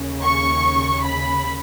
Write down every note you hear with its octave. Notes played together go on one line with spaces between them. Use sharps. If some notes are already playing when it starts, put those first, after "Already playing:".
Already playing: D#2 C#3
C#6
B5